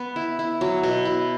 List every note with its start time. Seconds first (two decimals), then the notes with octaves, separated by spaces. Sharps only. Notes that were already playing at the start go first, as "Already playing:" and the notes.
Already playing: B3
0.16 E4
0.39 E4
0.61 F#3
0.83 B2
1.05 E4